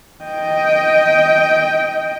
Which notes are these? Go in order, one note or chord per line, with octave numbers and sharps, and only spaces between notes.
D#5 G5